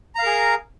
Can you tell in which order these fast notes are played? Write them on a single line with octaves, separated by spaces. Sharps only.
A#5 F5 A#4 G#4